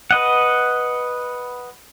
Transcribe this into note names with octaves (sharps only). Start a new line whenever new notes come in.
B4 D#5 F#5